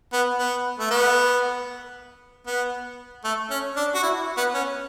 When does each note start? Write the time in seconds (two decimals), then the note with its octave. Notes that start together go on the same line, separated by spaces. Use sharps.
0.13 B3
0.38 B3
0.79 A3
0.90 B3
2.47 B3
3.24 A3
3.50 C#4
3.76 D4
3.95 F#4
4.03 E4
4.37 B3
4.54 C#4